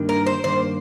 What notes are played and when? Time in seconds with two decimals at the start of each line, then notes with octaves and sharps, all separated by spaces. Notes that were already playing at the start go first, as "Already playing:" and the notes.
Already playing: G2 D#3 A#3 D4
0.09 A#4
0.26 C5
0.44 G2 D#3 A#3 D4 C5